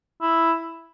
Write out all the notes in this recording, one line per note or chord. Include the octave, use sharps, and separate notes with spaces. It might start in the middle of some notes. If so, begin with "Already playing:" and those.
E4